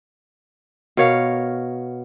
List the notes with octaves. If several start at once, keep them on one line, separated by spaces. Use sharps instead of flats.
B2 A#4 C#5 F5